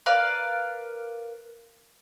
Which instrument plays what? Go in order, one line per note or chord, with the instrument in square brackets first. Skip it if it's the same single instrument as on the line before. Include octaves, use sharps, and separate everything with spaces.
[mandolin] A#4 B4 D5 F5